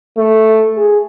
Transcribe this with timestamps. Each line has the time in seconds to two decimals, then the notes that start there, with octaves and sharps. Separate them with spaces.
0.17 A3
0.77 G#4